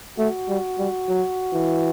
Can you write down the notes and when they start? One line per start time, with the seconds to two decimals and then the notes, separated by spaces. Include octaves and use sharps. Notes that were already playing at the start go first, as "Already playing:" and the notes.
0.18 A3 F#4
0.49 G3
0.78 G3
1.08 F#3
1.53 E3